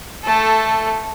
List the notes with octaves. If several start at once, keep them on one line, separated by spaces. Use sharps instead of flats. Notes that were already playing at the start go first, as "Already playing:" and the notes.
A3 A4